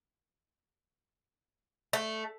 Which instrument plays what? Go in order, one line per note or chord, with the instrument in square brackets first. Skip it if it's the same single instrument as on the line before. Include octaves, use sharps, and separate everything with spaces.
[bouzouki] A3